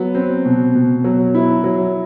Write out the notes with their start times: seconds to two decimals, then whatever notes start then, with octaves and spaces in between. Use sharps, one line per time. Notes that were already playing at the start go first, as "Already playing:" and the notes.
Already playing: F#3 B3
0.15 C4
0.45 B2
0.75 B2
1.04 F#3
1.35 E4
1.64 F#3